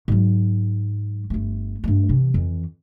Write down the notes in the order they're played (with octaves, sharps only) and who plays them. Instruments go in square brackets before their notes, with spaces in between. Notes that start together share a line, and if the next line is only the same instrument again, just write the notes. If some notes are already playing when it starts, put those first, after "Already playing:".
[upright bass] G#2 F#3
G1 A3
G2 A3
C3 E3
F2 E3